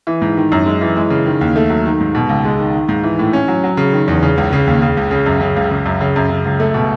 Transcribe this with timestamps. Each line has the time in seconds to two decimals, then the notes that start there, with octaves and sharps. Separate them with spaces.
0.07 E3
0.22 G#2
0.37 D#3
0.52 F#2
0.66 G#3
0.81 E3
0.96 G#3
1.10 C#3
1.26 D#3
1.41 D#2
1.56 A3
1.70 F#3
1.86 D#3
2.00 G#2
2.15 B2
2.29 C#2
2.45 G#3
2.59 D#3
2.74 D#3
2.89 G#2
3.04 E3
3.19 A2
3.33 C#4
3.48 F#3
3.64 F#3
3.77 C#3
3.93 D#3
4.08 E2
4.23 C#3
4.38 C#2
4.53 C#3
4.67 D#2
4.82 C#3
4.97 C#2
5.11 C#3
5.26 F#2
5.41 C#3
5.56 C#2
5.71 C#3
5.86 F#2
6.01 C#3
6.16 F#2
6.30 C#3
6.45 C#2
6.60 A3
6.74 B2